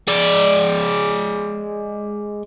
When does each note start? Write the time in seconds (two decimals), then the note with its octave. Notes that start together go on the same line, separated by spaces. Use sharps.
0.08 G#3 D5